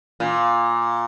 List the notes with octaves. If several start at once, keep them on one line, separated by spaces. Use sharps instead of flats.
A#2